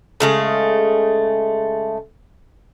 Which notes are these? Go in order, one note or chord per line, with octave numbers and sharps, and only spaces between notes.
C#3 G#3 A3